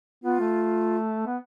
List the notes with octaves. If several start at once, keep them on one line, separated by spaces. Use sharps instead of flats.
B3 F4
A3
B3